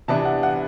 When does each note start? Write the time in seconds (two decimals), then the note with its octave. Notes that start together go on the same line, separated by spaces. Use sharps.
0.08 C3 E3 B3 D4 A5
0.25 F#5
0.43 F#5